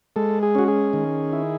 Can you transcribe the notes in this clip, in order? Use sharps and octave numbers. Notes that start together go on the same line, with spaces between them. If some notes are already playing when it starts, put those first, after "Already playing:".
G#3 A4
G#4
C#4 F#4
G#4
D#3
E4